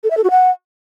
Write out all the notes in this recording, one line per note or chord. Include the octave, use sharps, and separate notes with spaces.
A4
E5
A4
F#4
F#5